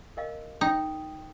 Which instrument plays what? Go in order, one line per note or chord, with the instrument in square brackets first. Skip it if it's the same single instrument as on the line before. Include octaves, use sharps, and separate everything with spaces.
[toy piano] A#4 D#5 F5
[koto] D#4 [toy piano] G5 C6 D#6